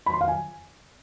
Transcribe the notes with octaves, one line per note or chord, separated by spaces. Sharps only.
B5
C6
F5
G#5